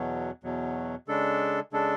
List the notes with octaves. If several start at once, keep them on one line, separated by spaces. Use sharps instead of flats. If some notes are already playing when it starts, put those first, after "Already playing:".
Already playing: E2 B2 F#3
E2 B2 F#3
C#3 G#3 D4 A4
C#3 G#3 D4 A4